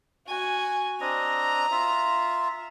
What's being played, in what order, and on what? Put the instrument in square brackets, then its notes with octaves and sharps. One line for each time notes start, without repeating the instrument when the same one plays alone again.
[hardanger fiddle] F#4 G#5
[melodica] C4 D4 D#5 [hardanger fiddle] A#5
[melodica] F4 E5